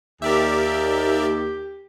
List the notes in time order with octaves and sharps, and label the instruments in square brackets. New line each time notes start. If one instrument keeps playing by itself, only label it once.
[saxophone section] D#2 [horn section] G4 [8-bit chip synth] A#4 D5 E5